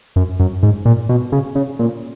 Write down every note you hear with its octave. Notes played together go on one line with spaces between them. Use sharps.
F#2
F#2
G#2
A#2
B2
C#3
C#3
A#2